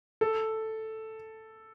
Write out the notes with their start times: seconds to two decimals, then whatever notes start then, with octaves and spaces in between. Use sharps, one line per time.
0.21 A4